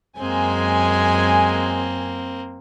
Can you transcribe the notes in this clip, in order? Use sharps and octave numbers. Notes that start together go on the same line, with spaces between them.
F#2 G#3 A#3 C4 G#5